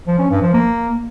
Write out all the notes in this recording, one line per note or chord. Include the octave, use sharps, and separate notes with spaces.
F3
C#4
G2
F3
A#3